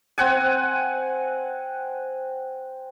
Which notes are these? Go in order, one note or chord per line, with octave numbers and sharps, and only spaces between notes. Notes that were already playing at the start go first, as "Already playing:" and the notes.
C4 F#5 G#5